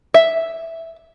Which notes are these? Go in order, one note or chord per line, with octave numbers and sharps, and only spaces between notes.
E5